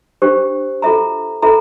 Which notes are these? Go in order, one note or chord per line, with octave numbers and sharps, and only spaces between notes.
D4 G4 C5
F4 A4 E5 A#5
F4 A4 E5 A#5